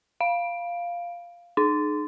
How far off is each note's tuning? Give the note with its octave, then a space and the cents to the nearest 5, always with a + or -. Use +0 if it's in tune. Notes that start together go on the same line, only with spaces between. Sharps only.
F5 -5
D#4 -40